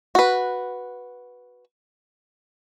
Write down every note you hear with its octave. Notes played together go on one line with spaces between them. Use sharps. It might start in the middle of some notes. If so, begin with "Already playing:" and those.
F#4 B4